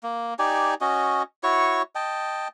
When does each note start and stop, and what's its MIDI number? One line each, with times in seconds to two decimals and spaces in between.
0.03 0.34 58
0.39 0.74 63
0.39 0.74 67
0.39 0.74 74
0.39 0.74 80
0.81 1.23 61
0.81 1.23 66
0.81 1.23 75
1.43 1.82 64
1.43 1.82 66
1.43 1.82 73
1.43 1.82 85
1.95 2.48 75
1.95 2.48 79
1.95 2.48 81